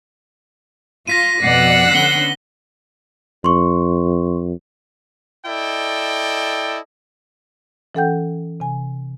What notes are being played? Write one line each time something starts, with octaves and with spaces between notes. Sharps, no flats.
F4 A#6 B6 D#7
F2 B2 D5 F#5 E6 F#6 C7
D3 B3 C#4 B6 G7
F2 C6 C#6
E4 A4 D5 D#5 G5
E3 C#4 A4 F#5 G5 G6
C3 G#5